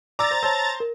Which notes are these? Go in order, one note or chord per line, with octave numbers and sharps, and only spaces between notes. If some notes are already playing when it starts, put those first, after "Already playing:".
D5 A#5 D6 E6 A6 A#6
C5
C5 C#5 A5 E6
A#4